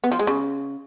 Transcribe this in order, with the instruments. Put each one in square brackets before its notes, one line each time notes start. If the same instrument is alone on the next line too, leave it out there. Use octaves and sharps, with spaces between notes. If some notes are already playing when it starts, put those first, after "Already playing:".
[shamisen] B3
F3
G#3
C#3